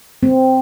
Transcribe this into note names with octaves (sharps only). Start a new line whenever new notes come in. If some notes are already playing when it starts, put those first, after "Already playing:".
C4